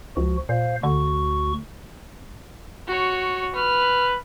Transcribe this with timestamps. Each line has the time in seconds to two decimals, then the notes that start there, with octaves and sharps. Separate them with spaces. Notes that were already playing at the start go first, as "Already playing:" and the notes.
0.17 C#2 F3 F#4
0.49 A#2 C5 F5
0.83 D2 D3 F#4 C#6
2.88 F#4 C#5
3.56 B4 F6